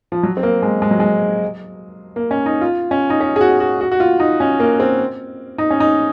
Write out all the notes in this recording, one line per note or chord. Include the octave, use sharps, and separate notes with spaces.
F3
F#3
C4
A#3
G#3
G#3
F#3
G#3
A#3
C#4
D#4
F4
C#4
D#4
C#4
G#4
F#4
F#4
F#4
F#4
F4
D#4
C#4
A#3
C4
D#4
C#4
D#4